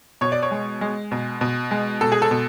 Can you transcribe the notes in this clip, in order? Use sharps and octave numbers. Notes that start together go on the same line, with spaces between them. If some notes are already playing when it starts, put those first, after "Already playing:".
B2 C#5
D5
C#5
G#3
G#3
B2
B2
G#3
B2 A4
G#4
A4
B2